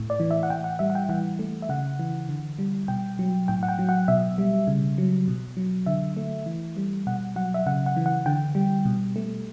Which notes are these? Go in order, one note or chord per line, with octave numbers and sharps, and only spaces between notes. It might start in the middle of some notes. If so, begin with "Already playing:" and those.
Already playing: A2 A3
D5
E3
E5
F#5
A2 G5
F#5
G3 E5
F#5
G5
E3 F#5
A3
E5
C#3 F#5
E3
D3
G3
B2 G5
F#3
A2 G5
F#5
G5
F#3
F#5
B2 E5
G3
C#3
F#3
B2
F#3
D3 E5
A3
E3
G3
B2 F#5
F#3 F#5
E5
C#3 F#5
F#5
E3
F#5
D3 G5
G3
B2
A3